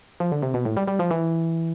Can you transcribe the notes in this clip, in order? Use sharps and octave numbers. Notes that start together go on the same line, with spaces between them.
F3
D3
C3
B2
A2
G3
G3
F3
E3